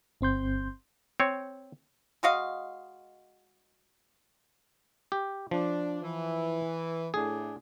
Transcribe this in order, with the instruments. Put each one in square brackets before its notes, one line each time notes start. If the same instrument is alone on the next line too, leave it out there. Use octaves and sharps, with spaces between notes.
[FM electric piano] G1 C4 C6 G6
[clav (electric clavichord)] C4 C#5
[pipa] G#3 F#4 D#5 F5
[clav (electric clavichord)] G4
[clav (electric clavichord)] F3 [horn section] D4
[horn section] E3
[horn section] A2 D4 [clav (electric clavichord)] G#4